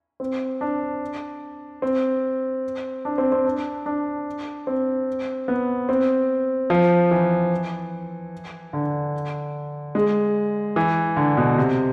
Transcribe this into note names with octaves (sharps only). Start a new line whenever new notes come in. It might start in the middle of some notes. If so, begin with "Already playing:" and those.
C4
D4
C4
D4
C4
C4
D4
D4
C4
B3
C4
F3
E3
D3
G#3
E3
D3
B2
C3